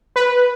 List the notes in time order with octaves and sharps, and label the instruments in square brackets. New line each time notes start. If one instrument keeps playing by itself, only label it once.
[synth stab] B4